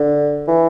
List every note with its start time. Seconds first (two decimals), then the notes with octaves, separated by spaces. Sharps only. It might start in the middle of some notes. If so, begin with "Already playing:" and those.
Already playing: D3
0.48 E3